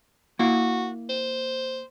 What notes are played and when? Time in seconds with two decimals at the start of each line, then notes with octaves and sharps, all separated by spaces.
0.39 A#3 E4 F#4 F5
1.09 C5